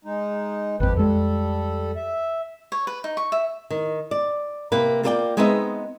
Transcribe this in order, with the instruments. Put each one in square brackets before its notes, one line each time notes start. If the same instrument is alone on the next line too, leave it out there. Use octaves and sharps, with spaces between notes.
[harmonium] G#3 D#4
[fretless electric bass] G#1 F2 [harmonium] G4 B4
[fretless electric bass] F2 G#3 [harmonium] G3 A4
[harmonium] E5
[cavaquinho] C#5
B4
D#4
C#6
E5
[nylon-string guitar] D#3
D5
C3 A#3 B4
A#3 F4 A4 C5 D5 G5
G#3 B3 C4 D#4 D#5 E5